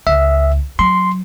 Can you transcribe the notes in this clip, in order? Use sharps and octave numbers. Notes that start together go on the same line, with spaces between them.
C#2 E5
F#3 C6